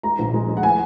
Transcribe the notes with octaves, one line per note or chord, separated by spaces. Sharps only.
G#3 A#5
A#1
G#3
G#3
F#5
G#5